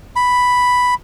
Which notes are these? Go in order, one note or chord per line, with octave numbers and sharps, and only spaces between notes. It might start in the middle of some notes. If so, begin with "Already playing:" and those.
B5